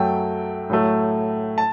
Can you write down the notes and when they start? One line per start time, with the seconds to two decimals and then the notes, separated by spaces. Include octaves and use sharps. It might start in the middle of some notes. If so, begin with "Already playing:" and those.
Already playing: F#2 F#3 A3 G5
0.70 A2 F#3 A3
1.58 A5